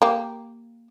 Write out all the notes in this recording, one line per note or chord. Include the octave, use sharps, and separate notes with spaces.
A#3 G4